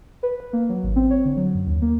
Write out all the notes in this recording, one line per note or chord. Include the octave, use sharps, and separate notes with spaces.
B4
B4
A#3
F#3
G#1
C4
C#5
D3
F#3
F#2
D#2
A#3